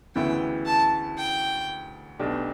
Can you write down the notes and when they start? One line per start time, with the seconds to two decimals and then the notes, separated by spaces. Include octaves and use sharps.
0.15 D2 C#3 E3 B3 E4 G5
0.66 A5
1.18 G5
2.19 B1 B2 A3 D4 G4